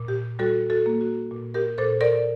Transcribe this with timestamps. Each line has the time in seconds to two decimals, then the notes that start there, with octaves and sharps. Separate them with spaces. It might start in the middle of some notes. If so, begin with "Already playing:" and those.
Already playing: A#2
0.08 G4
0.39 G3 F#4 A4
0.70 F#4 A4
0.86 A#3
1.01 F#4
1.31 A#2
1.54 G4 A#4
1.78 A#2 A4 C5
2.01 A#4 D5